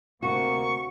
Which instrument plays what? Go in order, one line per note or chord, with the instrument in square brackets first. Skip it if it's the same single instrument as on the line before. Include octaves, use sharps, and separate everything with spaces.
[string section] D2 C3 [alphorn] A#3 [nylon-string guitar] F#4 [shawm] C#6